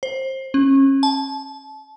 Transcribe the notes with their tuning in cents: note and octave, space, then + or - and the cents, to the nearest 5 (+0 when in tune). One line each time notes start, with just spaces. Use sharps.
C5 +20
C#4 -30
A5 -25